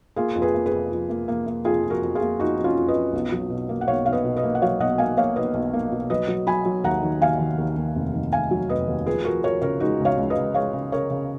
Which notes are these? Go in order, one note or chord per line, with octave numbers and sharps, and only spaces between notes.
A#3 F4 G#4
F2
G#4 B4
A#3
G#4 B4
F2
F3
A#3
A#3
A#3
F2 F4 G#4
F3
F#4 A#4
F2
F4 G#4
A#3
F2 D#4 F#4
F2
C#4 F4
F2
B4 D#5
F2
B1
F#3
B2
A#3
F#5
B1 C#5 F5
B1 F5
B4 D#5
B2
B4 D#5
A#3
F#5
F#3 C#5 F5
B1 D#5 F#5
A#3 F5 G#5
A#3 C#5 F5
B1 B4 D#5
B1
A#3
B2
F#3 B4 D#5
F#3
F#3 G#5 B5
F#3
D#2 F#5 A#5
D#3
D#2 F5 G#5
D#3
D#2
D#2
F1
D#3
F1 F5 G#5
F#3
F1 B4 D#5
D#2
F3 G#4 B4
F3 F#4 A#4
F3 A#4 C#5
C#3 A#4 C#5
G#3 D#4 F#4
C#2
C#5 F5
C#2
B4 D#5
C#2
G#3 C#5 F5
C#3
C#3 A#4 C#5
C#3